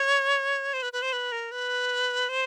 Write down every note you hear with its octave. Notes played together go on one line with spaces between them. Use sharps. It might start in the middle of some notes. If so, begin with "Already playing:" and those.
Already playing: C#5
C5
B4
B4
C5
B4
A#4
B4
C5